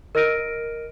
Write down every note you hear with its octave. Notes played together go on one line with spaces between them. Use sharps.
A#4 D#5 F6 A#6 D7 D#7